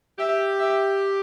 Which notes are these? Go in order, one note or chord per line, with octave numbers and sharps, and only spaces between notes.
G4 E5
E5